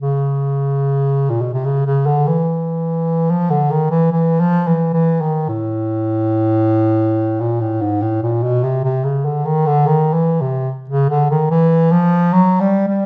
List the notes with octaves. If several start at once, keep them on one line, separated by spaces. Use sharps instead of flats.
C#3
A#2
B2
C3
C#3
C#3
D3
E3
F3
D3
D#3
E3
E3
F3
E3
E3
D#3
A2
A#2
A2
G#2
A2
A#2
B2
C3
C3
C#3
D3
D#3
D3
D#3
E3
C3
C#3
D3
D#3
E3
F3
F#3
G3
G3